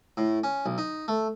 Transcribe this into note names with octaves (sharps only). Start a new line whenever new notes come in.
A2
C#4
B1
D#4
A3